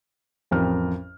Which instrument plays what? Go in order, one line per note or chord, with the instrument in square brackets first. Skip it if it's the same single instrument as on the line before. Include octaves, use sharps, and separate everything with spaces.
[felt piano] A1 F2 A#4 F6